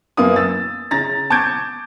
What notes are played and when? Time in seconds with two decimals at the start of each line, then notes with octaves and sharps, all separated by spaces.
0.17 F#2 A#3 B3 D#6
0.36 E6 A6
0.91 C#3 A#5 A6 A#6
1.30 A5 C#6 D6 G6 G#6 D7